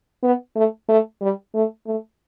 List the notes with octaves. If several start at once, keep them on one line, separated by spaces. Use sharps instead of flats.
B3
A3
A3
G3
A3
A3